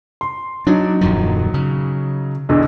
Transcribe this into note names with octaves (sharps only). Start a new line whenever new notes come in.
C6
F#3 D4 D#4
D#1 F#2 F3
C#3
B1 E2 D3